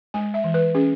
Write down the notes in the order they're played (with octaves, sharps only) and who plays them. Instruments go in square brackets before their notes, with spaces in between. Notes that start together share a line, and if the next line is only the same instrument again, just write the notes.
[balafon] G#3 G#5
E5
E3
B4
C#4 G#4